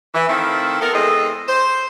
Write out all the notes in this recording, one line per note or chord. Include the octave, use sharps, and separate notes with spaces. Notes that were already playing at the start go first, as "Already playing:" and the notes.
E3
D#3 F3 A3 C4 E4
B3 A4 A#4
E2 G#3 C4 A4 D#5
C5